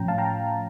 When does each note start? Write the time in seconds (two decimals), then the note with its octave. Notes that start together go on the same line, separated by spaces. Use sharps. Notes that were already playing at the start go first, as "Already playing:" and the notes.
Already playing: A2 F3 C#4 G5 A#5
0.08 F5 A5
0.18 G5 A#5